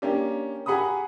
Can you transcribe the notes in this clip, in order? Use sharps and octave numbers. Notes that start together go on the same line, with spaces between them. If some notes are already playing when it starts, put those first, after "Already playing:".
A#3 C#4 D4 G4
G4 G#4 F#5 A#5 B5 D#6